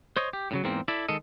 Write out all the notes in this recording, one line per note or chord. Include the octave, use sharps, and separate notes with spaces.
C5 C#5 D#5
G4
A2 C#3 F#3
E2 G#2 A#3 C4
E4 A4 D5 E5
D#3 G#3 A4 D#5